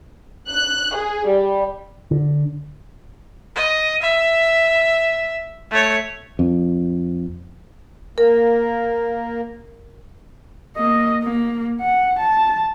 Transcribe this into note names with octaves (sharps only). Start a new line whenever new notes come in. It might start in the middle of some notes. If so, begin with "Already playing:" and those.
F#6
G#4
G3
D3
D#5
E5
A3 C#5
F2
A#3 A#4
A#3 D#5
A#3
F#5
A5